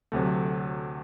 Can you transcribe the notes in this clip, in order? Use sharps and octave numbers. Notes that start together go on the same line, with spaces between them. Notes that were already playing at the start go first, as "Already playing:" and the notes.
D2 C3 F#3 A3